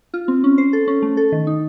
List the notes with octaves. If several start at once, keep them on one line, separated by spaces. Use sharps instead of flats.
F4
C4
C#4
C5
A4
C#4
A3
A4
D#3
D#4